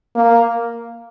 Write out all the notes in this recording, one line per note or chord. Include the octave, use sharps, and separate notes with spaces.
A#3